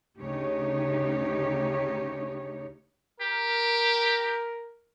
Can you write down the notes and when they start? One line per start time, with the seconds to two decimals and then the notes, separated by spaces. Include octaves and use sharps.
0.19 D2 C#3 D#4 G4 C#5
3.21 G4 A#4